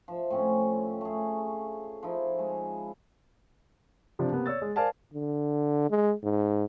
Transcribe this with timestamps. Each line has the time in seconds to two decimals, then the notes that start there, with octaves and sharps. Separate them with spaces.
0.08 F3 E5
0.30 A2 C4 C#4
1.01 A3 G#4
2.03 F3 D#4 E4
2.39 G#3
4.19 C3 F3 D4
4.32 C3 A#3 B3
4.46 C#5 D5 E6 A6
4.62 G#3
4.76 A#4 C5 D5 F5 G#5 A5
5.14 D3
5.90 G#3
6.23 G#2